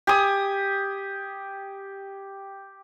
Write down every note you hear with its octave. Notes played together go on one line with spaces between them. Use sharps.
G4 G#5 D#6